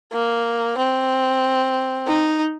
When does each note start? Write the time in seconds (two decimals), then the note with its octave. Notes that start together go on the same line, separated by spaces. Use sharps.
0.13 A#3
0.77 C4
2.07 D#4